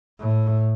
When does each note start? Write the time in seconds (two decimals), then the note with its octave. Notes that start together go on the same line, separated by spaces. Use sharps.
0.19 A2